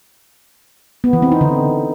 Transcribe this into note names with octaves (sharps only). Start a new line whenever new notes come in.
B3
E3
C4
D#4
D3